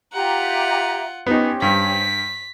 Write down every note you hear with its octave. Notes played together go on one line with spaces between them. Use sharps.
F4 G4 E5 F#5 A#5
B3 C#4 D#4 G4 C5
G2 B6